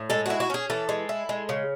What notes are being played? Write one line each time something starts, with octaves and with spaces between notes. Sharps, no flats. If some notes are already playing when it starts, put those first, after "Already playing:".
Already playing: A2
G#3 A4
E4 F#4
F#4
C#4 G#4
E3 A4
G#3
E4
G#3
C#3